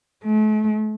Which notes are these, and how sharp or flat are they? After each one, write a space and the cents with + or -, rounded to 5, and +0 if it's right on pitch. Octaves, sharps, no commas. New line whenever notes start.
A3 -40